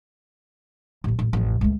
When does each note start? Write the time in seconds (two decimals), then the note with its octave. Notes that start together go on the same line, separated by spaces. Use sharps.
1.04 A1 D#2
1.19 A1
1.33 A1 F2
1.61 C#2 A3